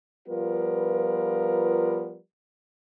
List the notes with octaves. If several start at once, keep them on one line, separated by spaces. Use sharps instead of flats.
F3 G3 B3 F4 A#4 B4